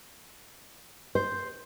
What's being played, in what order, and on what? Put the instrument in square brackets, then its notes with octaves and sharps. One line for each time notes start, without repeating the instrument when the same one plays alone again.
[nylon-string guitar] C5